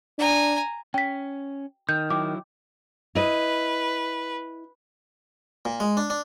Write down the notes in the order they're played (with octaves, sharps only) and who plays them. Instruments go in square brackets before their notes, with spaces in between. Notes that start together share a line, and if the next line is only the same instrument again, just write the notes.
[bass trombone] D4 [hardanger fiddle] G#5 A#5
[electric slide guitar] C#4 [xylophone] G5 B6
[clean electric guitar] D#3 [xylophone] G6
[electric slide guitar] F#3 E4 [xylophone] G5 D6
[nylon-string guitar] E4 D#5 [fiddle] B4
[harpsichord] A#2
G#3
D4
D4